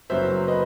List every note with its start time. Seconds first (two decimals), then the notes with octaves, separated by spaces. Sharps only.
0.10 F#1 F#2 F#3 B3 C5 E5
0.48 B4 D#5